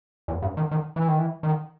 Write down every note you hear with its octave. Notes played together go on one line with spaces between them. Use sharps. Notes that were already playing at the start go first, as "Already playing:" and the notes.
E2
G2
D#3
D#3
E3
D#3
E3
D#3